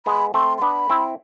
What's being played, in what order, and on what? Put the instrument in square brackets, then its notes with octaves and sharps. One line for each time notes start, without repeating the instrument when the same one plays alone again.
[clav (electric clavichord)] G#3 B3 [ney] B5
[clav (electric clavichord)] A3 C4 [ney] C6
[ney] C6
[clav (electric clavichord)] B3 D4 [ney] B5
[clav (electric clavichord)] C4 E4